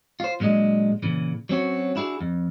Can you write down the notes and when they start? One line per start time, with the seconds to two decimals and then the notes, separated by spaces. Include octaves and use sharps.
0.20 F4 C5
0.40 A#2 F#3 G#3 D4 D#5
1.03 A#2 C#3 E3
1.49 F#3 C4 C#4 F#4
1.96 D4 E4 F#4 G#4
2.21 F2